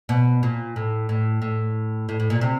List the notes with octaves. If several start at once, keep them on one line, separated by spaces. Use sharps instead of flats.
B2
A#2
A2
A2
A2
A2
A2
A#2
C3